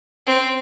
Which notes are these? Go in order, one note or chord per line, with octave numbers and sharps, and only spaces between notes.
C4